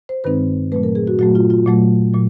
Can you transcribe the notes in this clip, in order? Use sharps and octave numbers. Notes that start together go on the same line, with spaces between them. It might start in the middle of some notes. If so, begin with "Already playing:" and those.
C5
G2 D#3 G#3 C4 D#4 B4
A#2 F#3 A3 B4
A#4
G#4
F#4
A#2 F#3 A3 F#4
F4
F4
A#2 F#3 A3
A#2 F#3